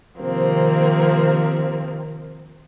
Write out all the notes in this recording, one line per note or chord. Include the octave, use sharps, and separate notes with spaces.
C3 D#3 F3 A#3 C4